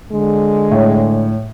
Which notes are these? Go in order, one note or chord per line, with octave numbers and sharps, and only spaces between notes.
D3 G#3
A2 C#5